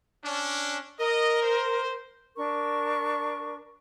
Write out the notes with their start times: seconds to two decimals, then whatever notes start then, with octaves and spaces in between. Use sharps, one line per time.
0.24 C#4 D4
0.99 A#4 D#5
1.42 C5
2.36 D4 A#4 C#6